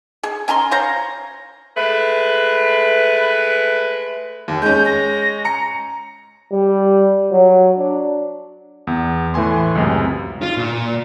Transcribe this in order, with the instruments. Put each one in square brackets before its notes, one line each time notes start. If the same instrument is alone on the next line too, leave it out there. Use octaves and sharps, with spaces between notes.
[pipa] G#4
C#4 G#5 A#5 C6
C5 C#5 F5 A#5
[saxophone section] G#3 A3 B4
[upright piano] D#2
[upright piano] G#3 C#4 [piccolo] G6
[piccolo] A#6
[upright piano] A#5 C#7
[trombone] G3
F#3
D4
[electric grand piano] E2
A2 E3 A3 G#5 C6
C#2 F#2 C3
[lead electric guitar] F4
A#2